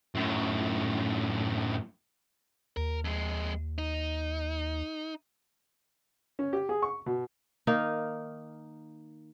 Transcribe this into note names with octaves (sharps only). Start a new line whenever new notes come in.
F#2 A2
D#2 A#4
F2 G#3
D#4
C#4
G4
G#4
C#6
B2
D#3 A#3 D#4